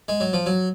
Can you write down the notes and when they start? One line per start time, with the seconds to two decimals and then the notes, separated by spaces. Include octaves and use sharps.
0.08 G#3
0.20 F#3
0.33 F3
0.46 F#3